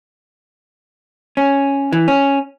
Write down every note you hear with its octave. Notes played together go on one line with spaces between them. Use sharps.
C#4
E3
C#4